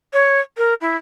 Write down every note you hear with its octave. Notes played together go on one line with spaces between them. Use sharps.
C#5
A#4
E4